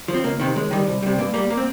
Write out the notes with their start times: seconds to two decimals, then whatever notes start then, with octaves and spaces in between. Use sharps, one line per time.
0.08 F3
0.14 C4
0.24 C#2 A#3
0.40 C3 D#3
0.56 D#2 G#3
0.71 D#3 G3
0.87 C2
1.03 C3 G3
1.18 G2 A#3
1.34 G3 A#3
1.50 A#3
1.57 C4